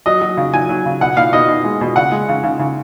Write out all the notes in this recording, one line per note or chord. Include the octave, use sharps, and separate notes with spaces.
F#3 D#5
F#3
C#3
F#3 G#5
F#3
C#3
B2 F#5
B2 F5
B2 D#5
B2
G#3
B2
C#3 F#5
G#3
C#3
C#3
C#3